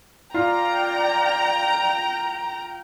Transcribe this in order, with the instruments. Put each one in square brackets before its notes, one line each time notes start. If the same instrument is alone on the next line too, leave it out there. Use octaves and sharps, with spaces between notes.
[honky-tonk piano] F4 [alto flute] D5 [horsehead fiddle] G5 [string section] A#5